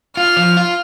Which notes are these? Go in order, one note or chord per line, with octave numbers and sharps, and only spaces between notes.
F4 F6
F3
F4